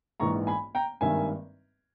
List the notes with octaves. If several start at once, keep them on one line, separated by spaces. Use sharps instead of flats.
A#1 G#2 E3 A#5 C#6
G#5 B5
G5 A#5
G#1 G2 D#3 A#3 E5 G#5